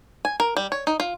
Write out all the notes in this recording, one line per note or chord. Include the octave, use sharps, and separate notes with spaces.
G#5
A#4
G3
C#5
D#4
F4